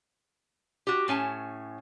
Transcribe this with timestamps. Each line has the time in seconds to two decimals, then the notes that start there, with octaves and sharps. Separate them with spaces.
0.87 F#4 G4
1.08 A2 C#4 G#5 A5